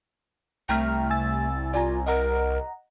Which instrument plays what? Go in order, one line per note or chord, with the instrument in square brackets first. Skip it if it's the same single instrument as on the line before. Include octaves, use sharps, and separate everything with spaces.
[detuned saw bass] C2 [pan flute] A3 [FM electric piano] G5 A#5 F6
[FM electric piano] G#5 E6 A6
[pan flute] F4 [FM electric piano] D5 G#5 A#5
[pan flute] A#4 [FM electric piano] D#5 F#5 A#5